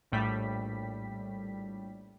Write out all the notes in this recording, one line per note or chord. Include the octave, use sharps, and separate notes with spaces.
A#1 A2 G3 A3 B6